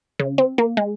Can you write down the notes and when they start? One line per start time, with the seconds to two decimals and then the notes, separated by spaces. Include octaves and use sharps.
0.19 C#3
0.38 C4
0.58 A#3
0.77 G#3